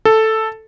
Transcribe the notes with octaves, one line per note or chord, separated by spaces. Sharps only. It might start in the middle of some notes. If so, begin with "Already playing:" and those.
A4